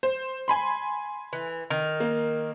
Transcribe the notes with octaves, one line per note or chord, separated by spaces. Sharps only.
C5
G#5 B5 C6
E3
D#3
A#3